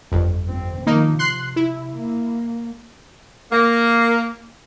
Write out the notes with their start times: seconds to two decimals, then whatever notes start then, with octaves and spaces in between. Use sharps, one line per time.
0.12 G1 F2
0.48 C4
0.87 D#3 F3 A#3 D#4
1.19 C3 C6 F#6 C7
1.56 E4
1.96 A#3
3.52 A#3